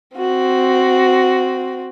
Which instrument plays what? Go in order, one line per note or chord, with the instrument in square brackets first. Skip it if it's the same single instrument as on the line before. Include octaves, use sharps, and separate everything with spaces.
[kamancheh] C4 F#4